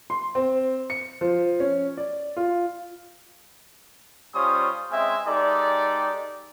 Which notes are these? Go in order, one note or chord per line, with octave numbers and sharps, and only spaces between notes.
C6
C4
C#7
F3
C#4
D5
F4
G3 C#4 F4 C5 C#5 D#6
G#3 C4 C#4 D#5 E5 G#5
G#3 D#4 G4 A4 D5